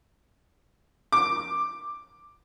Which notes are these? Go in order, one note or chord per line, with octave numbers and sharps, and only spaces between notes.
D6